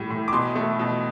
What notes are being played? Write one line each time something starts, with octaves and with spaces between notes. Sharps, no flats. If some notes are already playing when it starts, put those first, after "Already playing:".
Already playing: A2 G3
A2
D6
B2 C6
A3
B2